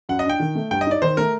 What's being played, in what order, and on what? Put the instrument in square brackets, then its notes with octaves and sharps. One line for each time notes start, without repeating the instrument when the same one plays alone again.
[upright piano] F#2 [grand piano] F#5
[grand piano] D#5
[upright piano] D4 [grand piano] G5
[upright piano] D#3
A3
[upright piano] G2 [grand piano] G5
[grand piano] D#5
[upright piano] D#4 [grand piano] D5
[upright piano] D#3 [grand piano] C5
[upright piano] A3 [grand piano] A#4